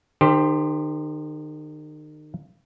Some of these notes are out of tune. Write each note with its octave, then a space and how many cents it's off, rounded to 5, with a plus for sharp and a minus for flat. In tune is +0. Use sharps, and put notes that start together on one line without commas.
D#3 -35 G4 +20 C5 +0